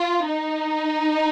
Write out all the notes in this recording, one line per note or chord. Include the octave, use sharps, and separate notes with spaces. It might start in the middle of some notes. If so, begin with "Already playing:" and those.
Already playing: F4
D#4